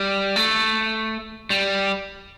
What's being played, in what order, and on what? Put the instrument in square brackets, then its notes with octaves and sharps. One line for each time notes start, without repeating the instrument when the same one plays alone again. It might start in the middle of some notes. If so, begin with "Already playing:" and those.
Already playing: [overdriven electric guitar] G3
A3
G3